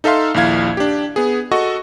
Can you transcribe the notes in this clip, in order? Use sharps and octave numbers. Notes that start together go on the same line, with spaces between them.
D#4 A4 E5 F5 C6
A#1 D#2 E4 F5 G#6
D4 G4
B3 G#4
F#4 A4 D#5 C#6